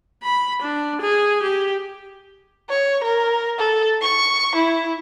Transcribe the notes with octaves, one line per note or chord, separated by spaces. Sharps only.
B5
D4
G#4
G4
C#5
A#4
A4
C#6
E4